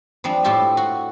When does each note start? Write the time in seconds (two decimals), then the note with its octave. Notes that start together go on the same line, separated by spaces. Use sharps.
0.24 F3 G3 C4 D4
0.44 A2 C4 F4 G4 E5
0.77 F#4